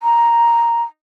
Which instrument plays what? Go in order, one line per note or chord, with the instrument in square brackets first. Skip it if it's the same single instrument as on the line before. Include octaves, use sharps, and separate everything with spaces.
[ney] A#5